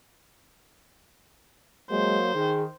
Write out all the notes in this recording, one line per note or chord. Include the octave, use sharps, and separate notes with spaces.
F#3 G#3 A#3 C5
D#3 G#4